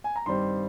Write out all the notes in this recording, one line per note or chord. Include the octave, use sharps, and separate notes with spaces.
G#5
A#5
G2 D#3 G3 C4 C6